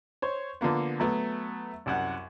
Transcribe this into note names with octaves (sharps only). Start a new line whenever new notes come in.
C5 C#5
D3 F3 A#3 B3
F#3 A3 B3
C2 F#2 F#5